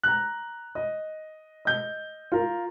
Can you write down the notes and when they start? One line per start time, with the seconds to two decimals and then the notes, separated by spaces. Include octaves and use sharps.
0.03 A#5 F#6
0.75 D#5
1.65 D#5 G6
2.32 F4 A#4